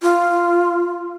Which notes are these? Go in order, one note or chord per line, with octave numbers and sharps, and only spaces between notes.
F4